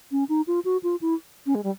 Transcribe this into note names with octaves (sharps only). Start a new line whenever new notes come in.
C#4
D#4
F4
F#4
F4
E4
C#4
G#3
G3